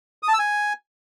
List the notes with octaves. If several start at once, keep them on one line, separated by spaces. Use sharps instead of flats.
D#6
A5
E6
G#5